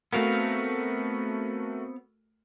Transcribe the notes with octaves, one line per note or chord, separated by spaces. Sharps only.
A3 B3 C4 F#4 A#4 F5